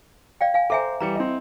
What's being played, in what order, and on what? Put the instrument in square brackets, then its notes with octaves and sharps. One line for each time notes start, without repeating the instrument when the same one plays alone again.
[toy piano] D5 F5 G5
F5 G#5
[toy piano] A4 E5 G#5 [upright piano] C5 A#5 D6
[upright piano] E3 G3 C#7 [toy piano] A#5
[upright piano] C4 E4 D#5